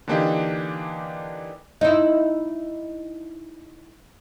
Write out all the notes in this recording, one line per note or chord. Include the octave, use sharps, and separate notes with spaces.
D3 E3 A#3 D4 D#4 G4
D#4 E4